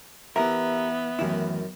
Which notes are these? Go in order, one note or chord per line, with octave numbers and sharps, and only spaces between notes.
E3 B3 G4 A#4 E5
F#2 A2 D#3 E3 E4